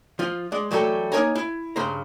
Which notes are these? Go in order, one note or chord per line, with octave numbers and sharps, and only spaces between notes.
F3 F4
G#3 D5
E3 F#3 G3 A3 A4
A#3 D#4 A#4 C#5 G#5 A#5
E4
G2 C#3 C5 A#5